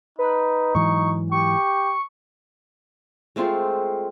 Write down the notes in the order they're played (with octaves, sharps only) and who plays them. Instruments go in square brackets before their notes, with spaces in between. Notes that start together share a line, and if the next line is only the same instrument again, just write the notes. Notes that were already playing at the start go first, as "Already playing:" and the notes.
[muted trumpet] D#4 [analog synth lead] B4
[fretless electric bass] G#2 E3 F#3 [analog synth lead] C#6
[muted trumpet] G4 [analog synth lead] C#6
[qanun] G#3 A3 C4 F4